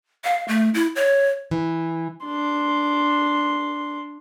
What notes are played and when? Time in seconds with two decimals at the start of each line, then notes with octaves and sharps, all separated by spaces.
0.24 F5
0.48 A3
0.74 E4
0.96 C#5
1.51 E3
2.25 D4 C6